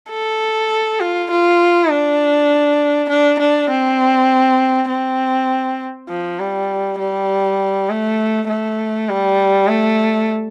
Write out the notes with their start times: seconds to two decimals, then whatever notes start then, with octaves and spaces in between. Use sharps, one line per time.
0.10 A4
1.00 F4
1.31 F4
1.90 D4
3.09 D4
3.39 D4
3.70 C4
4.89 C4
6.09 F3
6.39 G3
6.99 G3
7.89 A3
8.49 A3
9.09 G3
9.68 A3